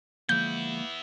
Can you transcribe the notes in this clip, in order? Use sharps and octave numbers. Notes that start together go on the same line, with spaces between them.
D3 F3 G#3 A#3 B3 E4 G6